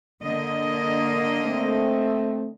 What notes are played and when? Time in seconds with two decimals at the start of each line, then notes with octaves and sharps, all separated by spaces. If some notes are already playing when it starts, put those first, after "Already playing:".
0.23 D3 A#3 D#5
1.45 A3 C4